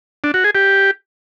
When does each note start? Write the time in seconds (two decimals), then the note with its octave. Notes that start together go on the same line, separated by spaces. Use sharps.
0.24 D4
0.34 F#4
0.44 G#4
0.55 G4